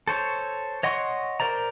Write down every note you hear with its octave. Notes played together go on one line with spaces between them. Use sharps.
A4 C5 C#5
C#5 D#5 F#5 C6 C#6
A#4 C5 D5 A#5